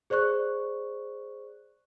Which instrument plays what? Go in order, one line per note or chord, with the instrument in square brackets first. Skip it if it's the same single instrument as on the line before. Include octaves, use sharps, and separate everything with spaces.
[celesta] G#4 C5 D5 C#6 F#6